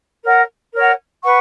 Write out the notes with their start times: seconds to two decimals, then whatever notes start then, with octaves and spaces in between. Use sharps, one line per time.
0.24 A#4 C#5 F#5
0.74 A#4 C#5 F#5
1.23 B4 F#5 C#6